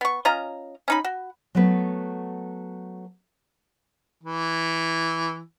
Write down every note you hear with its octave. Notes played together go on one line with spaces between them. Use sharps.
B3 C#6
C#4 F4 D#5 A#5
C#4 D#4 B5
F#4
F#3 A3 B3 B4
E3